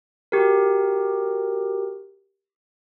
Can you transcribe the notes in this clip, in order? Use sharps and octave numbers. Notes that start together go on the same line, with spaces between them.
F#4 G4 A#4